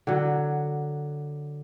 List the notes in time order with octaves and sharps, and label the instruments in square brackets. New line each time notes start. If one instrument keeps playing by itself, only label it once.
[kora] D3 F#3